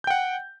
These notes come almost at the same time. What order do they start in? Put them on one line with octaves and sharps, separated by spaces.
G6 G5 F#5